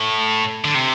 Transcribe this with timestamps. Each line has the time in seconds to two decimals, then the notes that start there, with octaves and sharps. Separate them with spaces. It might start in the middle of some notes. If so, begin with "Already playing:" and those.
Already playing: A2
0.64 D3
0.75 C3